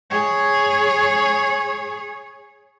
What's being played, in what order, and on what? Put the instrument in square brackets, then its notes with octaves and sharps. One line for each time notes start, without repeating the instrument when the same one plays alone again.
[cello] G#4 C#5